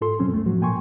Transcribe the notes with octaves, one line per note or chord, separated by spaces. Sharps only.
G#2 F4 A4 C6
F#2 B2 F#3 C4 C#4
D2 A3
A2 F3 F#3 F#4
A#2 A#3 G5 G#5 C6 C#6